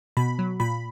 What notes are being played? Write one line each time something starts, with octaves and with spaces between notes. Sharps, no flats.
B2 B5
F#3
A#2 B5